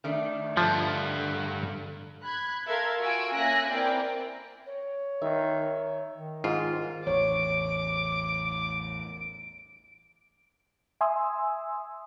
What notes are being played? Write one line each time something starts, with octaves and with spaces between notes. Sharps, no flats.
D#3 A3 D4
G2 D3 F3
B5 F#6 G#6
A4 A#4 E5 F5 C6 G#6
F4 F#4 G#5 E6 D7
A#3 C#4 E5 G#5 F#6 A#6
C4 E4 A#4 D5 G5 C6
C#5
D#3 E5
D#3
G#2 F4
A1 E2 C#5 D6 D7
E5 G#5 C6 D#6 E6